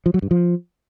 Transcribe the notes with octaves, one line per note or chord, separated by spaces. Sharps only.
F3
F#3
G2
F3